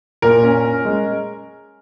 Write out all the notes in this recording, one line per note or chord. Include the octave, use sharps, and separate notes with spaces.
A#2 A#4
C#4
C#4
G#3